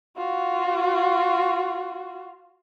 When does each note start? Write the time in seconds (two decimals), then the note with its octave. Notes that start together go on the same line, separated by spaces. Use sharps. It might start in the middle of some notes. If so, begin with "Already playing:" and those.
0.17 F4 F#4